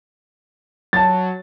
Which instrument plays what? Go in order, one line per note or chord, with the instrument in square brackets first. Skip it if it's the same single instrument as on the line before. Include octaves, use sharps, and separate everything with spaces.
[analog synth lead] F#3 [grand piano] A5 A6